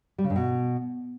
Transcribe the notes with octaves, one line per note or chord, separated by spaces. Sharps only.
G3
C#3
G2
B2